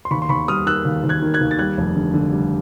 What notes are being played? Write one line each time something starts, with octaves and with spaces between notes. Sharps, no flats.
C6
D#2 B5 C#6
C6
D#2 B5 C#6
G3 D#6 F6
D#3 E6 F#6
D#2
D#2
F#6 G#6
D#3
F#6 G#6
D#2
A6
G3 F#6 G#6
F1
D3
D3
G3